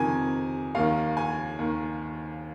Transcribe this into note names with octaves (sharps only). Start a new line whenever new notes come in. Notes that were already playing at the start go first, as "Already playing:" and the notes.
Already playing: F2 C3 D#3 G#5
D#2 D#3 F5
G#5
D#2 D#3